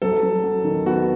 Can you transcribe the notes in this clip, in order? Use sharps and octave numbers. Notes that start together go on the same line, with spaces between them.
F#3 A4
F#3
F#3
D#3
B3 F#4